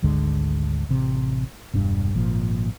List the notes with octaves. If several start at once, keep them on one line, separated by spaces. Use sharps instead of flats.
G#1 D2 D3 G#3
A1 C3
E1 G2 D4
G#1 A#2 F3